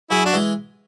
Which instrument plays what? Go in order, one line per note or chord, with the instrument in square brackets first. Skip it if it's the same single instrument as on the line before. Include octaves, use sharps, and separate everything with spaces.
[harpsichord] F#2 [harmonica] E4 G#4
[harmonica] D4 F#4
[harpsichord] E3 G#3